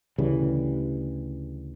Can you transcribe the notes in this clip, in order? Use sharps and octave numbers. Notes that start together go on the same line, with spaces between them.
D2 C#3 E3 G3